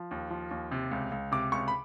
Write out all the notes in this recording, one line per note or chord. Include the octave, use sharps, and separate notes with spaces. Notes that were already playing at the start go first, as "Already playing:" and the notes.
Already playing: F3
D#2
F3
D#2
C3
C#2
C#2
C3 D6
C#2 C#6
B5